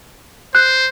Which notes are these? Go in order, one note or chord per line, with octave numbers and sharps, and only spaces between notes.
C5 F#6